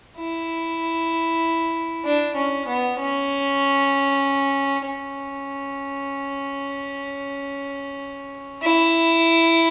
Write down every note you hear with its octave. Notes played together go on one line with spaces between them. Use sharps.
E4
D4
C#4
B3
C#4
C#4
E4